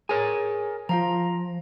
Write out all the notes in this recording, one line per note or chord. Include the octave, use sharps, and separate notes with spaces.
G#4 A#4 C#5 G#5
F3 F4 F5 A#5